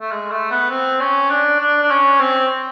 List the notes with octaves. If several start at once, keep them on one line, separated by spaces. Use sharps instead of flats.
A3
G#3
A3
B3
C4
C#4
D4
D4
D4
C#4
C4